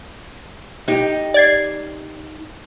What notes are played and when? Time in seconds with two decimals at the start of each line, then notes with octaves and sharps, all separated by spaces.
0.88 D#4 G4
1.34 D5 G#6 C7